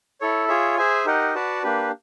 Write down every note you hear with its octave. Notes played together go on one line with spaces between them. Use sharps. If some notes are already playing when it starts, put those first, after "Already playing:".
E4 A4 C#5
F4 G#4 C#5 E5
G#4 C5 E5 G#5
D#4 G4 A#4 D#5 F#5
F#4 B4 D5 F#5 A5
A#3 D4 G4 B4